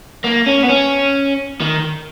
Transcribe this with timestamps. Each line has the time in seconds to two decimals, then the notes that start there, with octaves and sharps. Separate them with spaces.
0.24 A#3
0.47 C#4
0.63 B3
0.69 C#4
1.60 D#3